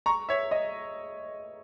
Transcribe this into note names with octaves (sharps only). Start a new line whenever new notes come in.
A#5 C#6
C#5 E5
D#5